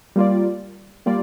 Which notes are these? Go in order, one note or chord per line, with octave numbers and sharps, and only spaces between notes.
G3 A#3 F4 D5
G3 A#3 F4 D5